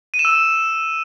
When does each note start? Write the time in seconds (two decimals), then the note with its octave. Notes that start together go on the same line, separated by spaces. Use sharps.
0.14 D#7
0.19 E7
0.25 E6